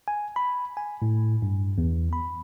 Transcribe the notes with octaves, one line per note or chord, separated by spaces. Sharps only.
G#5
B5
G#5
A2
G2
E2
B5